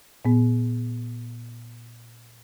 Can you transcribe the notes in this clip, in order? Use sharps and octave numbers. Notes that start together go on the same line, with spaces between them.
A#2 B3